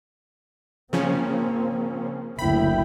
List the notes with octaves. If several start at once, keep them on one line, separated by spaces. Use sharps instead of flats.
C#3 F3 A#3 C4 C#4
F#1 D2 E4 G5 B5